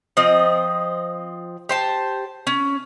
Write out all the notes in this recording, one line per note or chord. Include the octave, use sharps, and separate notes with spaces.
F3 C4 D#5
G4 C5 A5
C#4